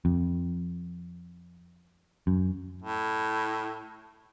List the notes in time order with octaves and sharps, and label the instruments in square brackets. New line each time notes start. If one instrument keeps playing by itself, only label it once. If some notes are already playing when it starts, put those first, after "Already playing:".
[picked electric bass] F2
F#2
[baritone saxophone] A2